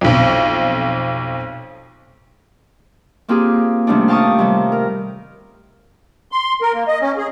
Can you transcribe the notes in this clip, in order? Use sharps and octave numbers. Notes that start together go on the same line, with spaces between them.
B1 F2
A#3 C4 F4 G4 G#4
C3 D#3 G3 A3 C#4 D4
F5 G5 A5 C#6 D#6
C3 D#3 G3
A#4
C6
A#4
A#3
D#5
C#4
G#4